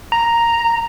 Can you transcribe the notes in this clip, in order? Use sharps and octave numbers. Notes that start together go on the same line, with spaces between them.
A#5